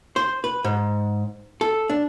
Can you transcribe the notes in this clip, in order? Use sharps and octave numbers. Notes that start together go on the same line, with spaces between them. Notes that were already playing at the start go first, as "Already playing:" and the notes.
C5
B4
G#2
A4
D4